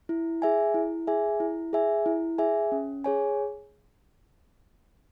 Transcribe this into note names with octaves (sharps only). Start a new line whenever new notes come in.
E4
G#4 E5 G#5
E4
G#4 E5 G#5
E4
G#4 E5 G#5
E4
G#4 E5 G#5
C#4
G#4 C#5 G#5